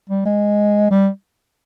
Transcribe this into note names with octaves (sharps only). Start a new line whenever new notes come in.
G3
G#3
G3